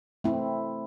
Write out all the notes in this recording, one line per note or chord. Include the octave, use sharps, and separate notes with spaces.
A3 C4 E4